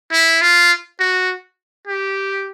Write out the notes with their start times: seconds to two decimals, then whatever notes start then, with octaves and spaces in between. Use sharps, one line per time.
0.12 E4
0.42 F4
1.00 F#4
1.87 G4